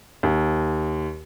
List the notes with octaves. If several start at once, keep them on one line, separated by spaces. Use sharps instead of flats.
D#2